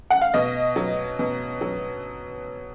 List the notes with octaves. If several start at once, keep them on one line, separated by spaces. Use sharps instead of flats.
F#5
F5
B2 D#5
F#3
B2
F#3